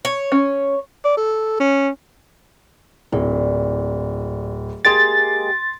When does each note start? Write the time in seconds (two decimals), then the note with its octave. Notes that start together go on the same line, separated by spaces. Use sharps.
0.05 C#5
0.32 C#4
1.05 D5
1.17 A4
1.60 C#4
3.12 D1 A#2
4.85 G#3 A#3 G4 C6 A6 D7